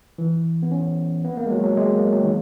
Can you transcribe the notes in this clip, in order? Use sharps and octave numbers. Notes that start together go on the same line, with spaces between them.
E3
B3
C#4
B3
A#3
G#3
F#3
F#3
G#3
A#3
F#3
D#3